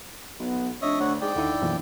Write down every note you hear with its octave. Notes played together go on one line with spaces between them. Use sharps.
B1 B3
F1 D4 C#5 D#5 E5
D2 C#5 F#5
G#2 G#4 D5 G5
D#2 D3 D#4 E4
A#1 F#2 B2 E3